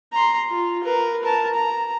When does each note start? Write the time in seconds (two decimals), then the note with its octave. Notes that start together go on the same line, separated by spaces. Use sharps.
0.13 A#5 C6
0.50 F4
0.84 A#4 B4
1.24 A#4 A5
1.54 A#5